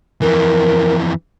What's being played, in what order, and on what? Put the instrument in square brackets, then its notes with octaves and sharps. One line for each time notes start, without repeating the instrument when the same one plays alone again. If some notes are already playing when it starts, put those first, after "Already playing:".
[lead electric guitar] F2 E3 [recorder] A#4